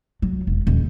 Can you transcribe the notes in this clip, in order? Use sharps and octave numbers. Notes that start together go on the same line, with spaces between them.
F#3
E1
D#1